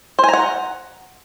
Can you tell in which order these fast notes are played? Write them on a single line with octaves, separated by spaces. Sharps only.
C5 G#5 A#5 F#5